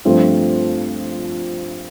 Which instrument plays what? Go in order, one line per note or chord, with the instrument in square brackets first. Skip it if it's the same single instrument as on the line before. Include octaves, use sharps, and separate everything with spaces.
[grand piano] G2 F3 A3 C4 F4